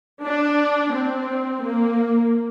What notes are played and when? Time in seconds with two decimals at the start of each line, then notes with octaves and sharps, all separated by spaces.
0.23 D4
0.93 C4
1.63 A#3